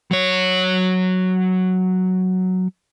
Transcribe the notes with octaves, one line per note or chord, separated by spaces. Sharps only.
F#3 C#5